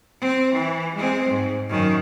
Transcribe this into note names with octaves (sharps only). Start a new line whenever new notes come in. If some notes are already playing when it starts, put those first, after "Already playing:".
C4
E3
G#3 C4
G#2
F#2 D#3